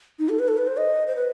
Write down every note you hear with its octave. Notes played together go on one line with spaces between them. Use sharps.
D#4
A4
B4
A4
B4
C5
D#5
C5
B4